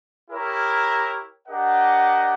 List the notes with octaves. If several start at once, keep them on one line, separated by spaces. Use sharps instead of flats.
E4 G4 A#4 C#5
D4 G4 A#4 D#5 F#5